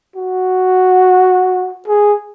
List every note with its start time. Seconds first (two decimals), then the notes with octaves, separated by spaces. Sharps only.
0.16 F#4
1.88 G#4